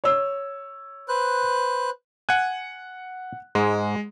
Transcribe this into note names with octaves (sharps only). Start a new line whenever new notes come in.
C#5 E6
B4 C5 F#6
F#5 G#5 F#6
G#2 G#3